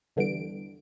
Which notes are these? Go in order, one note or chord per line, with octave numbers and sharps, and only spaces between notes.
E2 D3 E3 G3 D7